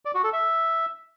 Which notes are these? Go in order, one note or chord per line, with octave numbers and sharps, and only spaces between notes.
D5
F#4
A4
E5